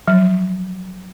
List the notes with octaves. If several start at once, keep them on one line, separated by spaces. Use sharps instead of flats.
F3 F#3